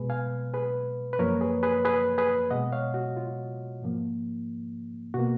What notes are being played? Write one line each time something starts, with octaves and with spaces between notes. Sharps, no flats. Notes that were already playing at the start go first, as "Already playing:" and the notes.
Already playing: B2 G#3 G#4 B4
F5 G#5
G#4 B4
B4
F#2 F3 A#3 A#4 C#5
G#4 B4
G#4 B4
G#4 B4
G#4 B4
B2 G#3 D#5 F#5
C#5 F5
F#4
F4
G#2 F3 A#3
B2 A#3 F#4